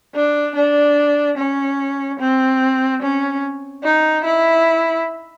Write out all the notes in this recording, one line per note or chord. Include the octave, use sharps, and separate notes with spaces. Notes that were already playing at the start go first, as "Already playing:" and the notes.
D4
D4
C#4
C4
C#4
D#4
E4